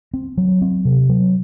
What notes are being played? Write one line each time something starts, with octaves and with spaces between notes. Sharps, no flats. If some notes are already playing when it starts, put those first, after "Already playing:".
C4
F#3
C4
C3
F#3